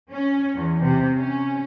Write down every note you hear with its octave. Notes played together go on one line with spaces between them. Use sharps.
C#4
E2
C3
C#4